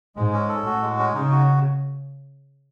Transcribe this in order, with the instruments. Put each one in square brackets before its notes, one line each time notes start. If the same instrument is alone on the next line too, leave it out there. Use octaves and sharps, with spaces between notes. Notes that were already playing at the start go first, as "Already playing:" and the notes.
[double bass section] G#2 [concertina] G#3
[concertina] C#4
A4
[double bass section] A2 [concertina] F#4
[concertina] G#3
C#4
[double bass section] C#3 [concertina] D#4
[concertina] F#4